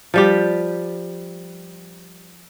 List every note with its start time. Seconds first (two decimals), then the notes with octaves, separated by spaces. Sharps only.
0.14 F3 G3 G4